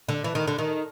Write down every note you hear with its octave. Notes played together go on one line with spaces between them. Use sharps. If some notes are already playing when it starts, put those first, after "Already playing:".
D3
E3
D#3
D3
D#3